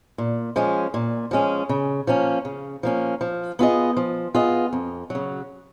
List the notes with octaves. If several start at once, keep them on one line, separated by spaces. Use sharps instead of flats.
A#2
F3 G#3 C#4
A#2
F3 G#3 C#4
C#3
F3 A#3 C#4
C#3
F3 A#3 C#4
F3
B3 F4 G#4 D#5
F3
B3 F4 G#4 D#5
F2
C#3 F#3